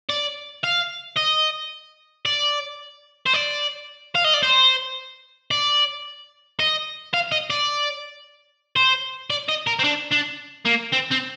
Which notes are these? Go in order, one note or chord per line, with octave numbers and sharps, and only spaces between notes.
D5
F5
D#5
D5
C5
D5
F5
D#5
D5
C5
D5
D#5
F5
D#5
D5
C5
D5
D#5
A#4
C4
D4
D4
A#3
C4
C4